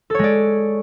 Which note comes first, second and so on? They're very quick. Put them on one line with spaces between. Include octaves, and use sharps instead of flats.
A4 C#5 G#3 D5